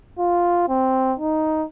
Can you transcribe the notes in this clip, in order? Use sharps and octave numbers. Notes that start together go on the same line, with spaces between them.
F4
C4
D#4